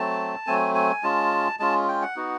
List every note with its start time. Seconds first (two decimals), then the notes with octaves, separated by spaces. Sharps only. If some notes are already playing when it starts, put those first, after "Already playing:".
Already playing: F#3 A3 C4 A5
0.47 F#3 A3 C4 G#5
0.75 G#5
1.03 G#3 C#4 F4 A5
1.60 G#3 C#4 F4 A5
1.88 G5
2.02 F#5
2.16 B3 D#4 F#4